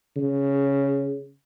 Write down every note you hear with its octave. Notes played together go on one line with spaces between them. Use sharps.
C#3